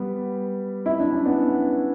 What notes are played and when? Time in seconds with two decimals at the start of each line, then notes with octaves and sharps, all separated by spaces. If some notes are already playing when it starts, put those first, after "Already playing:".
Already playing: G3 B3
0.86 E4
1.00 D4
1.12 C#4
1.25 B3 D4